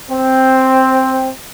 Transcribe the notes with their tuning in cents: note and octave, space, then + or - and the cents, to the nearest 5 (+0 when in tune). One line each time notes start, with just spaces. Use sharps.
C4 +5